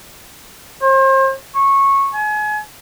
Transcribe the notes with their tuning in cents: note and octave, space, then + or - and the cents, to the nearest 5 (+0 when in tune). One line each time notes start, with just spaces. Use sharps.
C5 +40
C#6 -15
G#5 +35